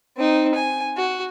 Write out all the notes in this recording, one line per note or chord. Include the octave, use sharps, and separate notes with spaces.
C4 D#4
G#5
F#4